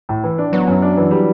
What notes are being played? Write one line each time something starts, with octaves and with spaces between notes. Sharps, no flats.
A2
E3
D4
F#3 B3
F#2
D4
E3
G3